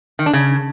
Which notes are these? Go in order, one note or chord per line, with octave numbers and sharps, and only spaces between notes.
D#3
D4
C#3